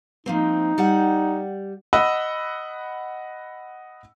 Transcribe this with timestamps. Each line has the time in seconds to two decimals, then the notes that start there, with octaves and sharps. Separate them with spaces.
0.26 F3 A#3 C4 D#4
0.78 G3 D5 F#5
1.93 D#5 F#5 B5 E6